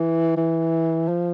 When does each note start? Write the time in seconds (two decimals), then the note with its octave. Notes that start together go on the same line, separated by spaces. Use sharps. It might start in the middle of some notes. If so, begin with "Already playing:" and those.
Already playing: E3
0.37 E3
1.08 F3